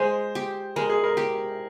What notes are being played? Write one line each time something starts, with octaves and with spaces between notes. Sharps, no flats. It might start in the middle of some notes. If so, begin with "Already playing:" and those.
Already playing: G#3 C5
G4
G#3 A#4
G#4
A#4
G4